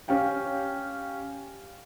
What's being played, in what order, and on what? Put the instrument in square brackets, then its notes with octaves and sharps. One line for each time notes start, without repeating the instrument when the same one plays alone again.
[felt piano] C#4 G4 F5 G5